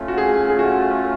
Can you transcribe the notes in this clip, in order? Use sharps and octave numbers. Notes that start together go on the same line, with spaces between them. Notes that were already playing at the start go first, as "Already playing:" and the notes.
Already playing: A3 C#4 F4
F#4
G#4
G#4
F#4